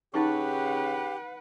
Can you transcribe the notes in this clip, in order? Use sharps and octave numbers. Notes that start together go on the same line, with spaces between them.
C#3 D#4 G4 B4 F#5 C#6